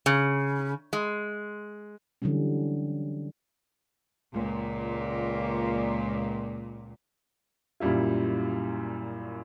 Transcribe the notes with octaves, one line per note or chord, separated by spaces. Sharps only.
C#3
G#3
D3 E3 F#3 G3 C#4
C#2 A#2
F#2 A#2 G3 E4 F4